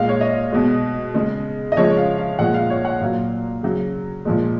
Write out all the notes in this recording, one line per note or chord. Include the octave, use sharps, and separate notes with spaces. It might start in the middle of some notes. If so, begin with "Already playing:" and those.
Already playing: A#2 G#3 F5
C#5
D#5
B2 G#3
C#3 G#3
D#5
C#3 F3 G#3 C#5
F5
F5
A#2 F3 G#3 F#5
F5
C#5
F#5
A#2 F#3 F5
C#3 F#3
A#2 F3 G#3